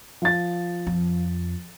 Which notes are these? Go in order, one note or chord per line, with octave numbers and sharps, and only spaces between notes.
F3 A6
F2